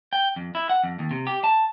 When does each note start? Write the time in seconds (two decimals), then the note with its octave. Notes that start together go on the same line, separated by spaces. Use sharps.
0.13 G5
0.36 F2
0.55 E4
0.69 F#5
0.84 F2
0.99 D#2
1.11 C3
1.27 G4
1.44 A5